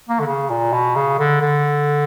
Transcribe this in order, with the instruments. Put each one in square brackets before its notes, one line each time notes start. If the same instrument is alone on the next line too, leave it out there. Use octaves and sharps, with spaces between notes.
[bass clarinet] A#3
D3
C#3
A#2
B2
C#3
D3
D3